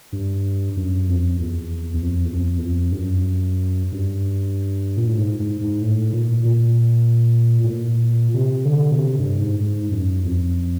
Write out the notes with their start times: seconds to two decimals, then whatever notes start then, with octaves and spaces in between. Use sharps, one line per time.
0.12 G2
0.77 F#2
1.08 F2
1.40 E2
1.94 E2
2.02 F2
2.25 E2
2.34 F2
2.58 E2
2.65 F2
2.92 G2
2.98 F#2
3.92 G2
4.97 A#2
5.08 A2
5.18 G#2
5.39 G#2
5.61 G#2
5.82 A2
6.13 A#2
6.45 A#2
7.64 A2
7.71 A#2
8.34 C3
8.65 D3
8.91 B2
8.97 C3
9.19 G2
9.39 G#2
9.60 G#2
9.91 F#2
10.24 F2